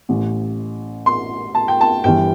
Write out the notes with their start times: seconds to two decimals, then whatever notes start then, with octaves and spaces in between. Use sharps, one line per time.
0.09 A1 A2 E3
1.06 C6
1.55 A5
1.68 G5
1.81 A5
2.04 G1 G2 E3 G5